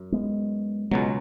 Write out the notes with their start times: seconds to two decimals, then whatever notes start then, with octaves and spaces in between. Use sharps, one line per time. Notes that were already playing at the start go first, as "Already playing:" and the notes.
Already playing: F#2
0.12 G#3 B3
0.91 C#2 B2 F#3 G#3 B3